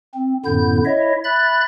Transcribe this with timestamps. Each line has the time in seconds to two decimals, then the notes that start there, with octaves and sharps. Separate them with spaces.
0.14 C4
0.45 F#2 A2 D3 B3 E4 G6
0.85 E4 C#5 D#5 E5
1.24 E5 B5 F#6 A6